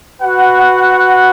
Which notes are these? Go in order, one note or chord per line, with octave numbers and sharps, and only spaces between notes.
F#4 B4 F#5